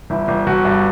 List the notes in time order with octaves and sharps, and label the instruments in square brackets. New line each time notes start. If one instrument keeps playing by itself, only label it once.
[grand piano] G1 E4
G1
G1 F#4
G2